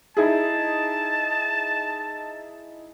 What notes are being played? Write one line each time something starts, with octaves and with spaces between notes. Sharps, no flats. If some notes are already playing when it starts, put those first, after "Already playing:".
D#4 E4 G#4 A5